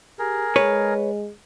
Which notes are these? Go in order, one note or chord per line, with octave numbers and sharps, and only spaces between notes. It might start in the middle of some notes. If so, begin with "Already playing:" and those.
G4 G#4 A#4
G#3 B4 C#5